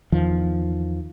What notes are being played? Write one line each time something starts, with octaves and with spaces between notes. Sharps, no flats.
E2 D#3 F3